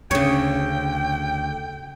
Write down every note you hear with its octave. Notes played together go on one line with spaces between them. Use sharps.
D2 C#3 C#5 G5